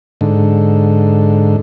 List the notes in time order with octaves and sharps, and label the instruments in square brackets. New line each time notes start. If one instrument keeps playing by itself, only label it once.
[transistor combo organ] G#2 D3